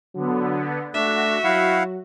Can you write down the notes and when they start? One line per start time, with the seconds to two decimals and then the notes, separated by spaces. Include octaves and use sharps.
0.15 D3 F#3 B3
0.94 A3 D4 F#4 E5
1.44 F#3 E4 F5 F#5